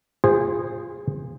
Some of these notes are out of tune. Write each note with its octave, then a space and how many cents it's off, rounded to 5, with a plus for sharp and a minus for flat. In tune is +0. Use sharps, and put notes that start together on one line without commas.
F4 +0 G#4 -25 C5 +0